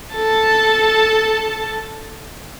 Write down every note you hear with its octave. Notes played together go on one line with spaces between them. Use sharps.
A4 A5